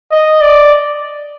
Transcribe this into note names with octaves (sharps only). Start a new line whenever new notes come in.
D#5
D5